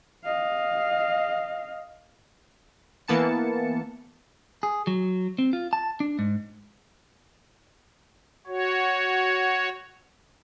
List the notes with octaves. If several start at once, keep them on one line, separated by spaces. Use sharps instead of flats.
D#5 F5
E3 A#3 B3 A5 C#7
G#4
F#3
C4
F4
A5
D4
G#2
F#4 C#5